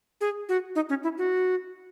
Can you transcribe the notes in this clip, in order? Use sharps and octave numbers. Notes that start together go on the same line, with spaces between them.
G#4
F#4
D#4
C#4
E4
F#4